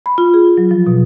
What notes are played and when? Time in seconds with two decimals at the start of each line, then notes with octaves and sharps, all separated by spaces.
0.06 B5
0.18 F4
0.34 G#4
0.58 F#3
0.71 F3
0.87 B2